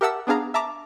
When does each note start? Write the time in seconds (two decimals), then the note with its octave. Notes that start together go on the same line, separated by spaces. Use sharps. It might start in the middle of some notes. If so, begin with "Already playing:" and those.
0.01 G4 A#4 E5 F#5 A5 E6
0.27 B3 D4 G#4 F5 A#5
0.54 E5 A5 A#5 D6